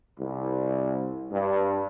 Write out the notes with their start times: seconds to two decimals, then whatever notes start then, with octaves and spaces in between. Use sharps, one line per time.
0.20 C2
1.31 G2